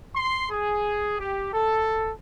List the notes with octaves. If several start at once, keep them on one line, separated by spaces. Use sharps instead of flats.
C6
G#4
G4
A4